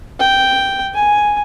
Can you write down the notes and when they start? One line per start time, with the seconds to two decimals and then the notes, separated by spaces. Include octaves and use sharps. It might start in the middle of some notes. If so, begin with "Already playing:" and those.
0.20 G5
0.94 G#5